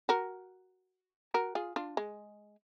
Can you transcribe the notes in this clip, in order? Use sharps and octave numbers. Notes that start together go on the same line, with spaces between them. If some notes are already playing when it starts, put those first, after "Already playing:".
F#4 A#4
F#4 A#4
F4 G#4
D4 F4
G#3